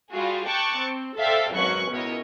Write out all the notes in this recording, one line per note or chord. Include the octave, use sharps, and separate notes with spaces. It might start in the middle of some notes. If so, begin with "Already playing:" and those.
G3 F4 F#4 G#4
G5 A5 C#6 D6 F#6
C4
A4 C5 D5 E5 F5 G5
G#1 F#3 C#4 B4 C#6 F#6
C#2 B2 E4 A#4 C#5 D#5